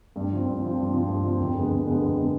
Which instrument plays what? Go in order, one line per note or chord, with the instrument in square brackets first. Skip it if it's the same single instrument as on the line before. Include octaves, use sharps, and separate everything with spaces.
[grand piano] G2
F3 C4
G2
F3 C4
G2
F3 C4
G2
F3 C4
F2
D3 G#3 B3
F2
D3 G#3 B3
F2
D3 G#3 B3